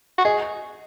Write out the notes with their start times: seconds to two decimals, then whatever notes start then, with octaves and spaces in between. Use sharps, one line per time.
0.18 F#4
0.25 G#4 D#5